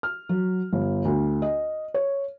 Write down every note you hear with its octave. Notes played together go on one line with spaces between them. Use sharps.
F6
F#3
G1
D2
D#5
C#5